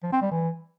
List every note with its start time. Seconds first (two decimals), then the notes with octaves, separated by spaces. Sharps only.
0.03 F3
0.13 C4
0.22 G3
0.31 E3